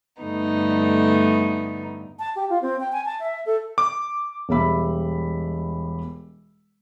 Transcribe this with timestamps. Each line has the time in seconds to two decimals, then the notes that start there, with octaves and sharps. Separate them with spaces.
0.22 G2 D3 A3 B3 D#4
2.19 A5
2.36 G4
2.50 F4
2.62 C4
2.80 G5
2.92 G#5
3.05 A5
3.20 E5
3.46 A4
3.78 D6
4.49 E1 B2 G3 E5 B5 D6